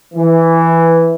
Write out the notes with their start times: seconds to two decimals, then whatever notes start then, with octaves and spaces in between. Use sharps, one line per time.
0.14 E3